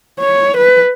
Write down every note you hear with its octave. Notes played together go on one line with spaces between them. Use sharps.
C#5
B4